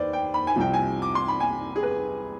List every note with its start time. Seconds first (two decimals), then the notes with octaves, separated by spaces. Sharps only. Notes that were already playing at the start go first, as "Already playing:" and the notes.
Already playing: D#2 B4 C5 D5
0.13 G5
0.34 B5
0.47 G#5
0.56 C2 C3 F3 G5
0.74 G#5
1.02 D6
1.15 C6
1.28 B5
1.40 G#5
1.76 G#4
1.83 B4